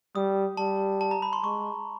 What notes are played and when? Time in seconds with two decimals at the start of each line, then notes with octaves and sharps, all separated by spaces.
0.15 G3 D#6
0.57 G3 A5
1.01 A5
1.11 A#5
1.22 B5
1.33 C6
1.44 G#3 C#6